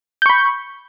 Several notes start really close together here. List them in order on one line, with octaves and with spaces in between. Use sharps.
G6 C#6 B5